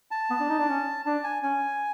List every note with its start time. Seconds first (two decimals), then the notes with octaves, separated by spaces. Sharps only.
0.11 A5
0.30 B3
0.40 D4
0.49 D#4
0.58 D4
0.68 C#4
1.05 D4 A5
1.24 G#5
1.43 C#4 G#5